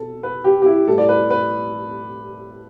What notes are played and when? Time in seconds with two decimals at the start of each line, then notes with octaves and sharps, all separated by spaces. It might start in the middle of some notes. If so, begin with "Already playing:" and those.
Already playing: B2 A4
0.23 B4
0.44 G4
0.62 G4
0.66 E4
0.88 A2 G3 A4
0.98 D5
1.09 B4
1.31 B4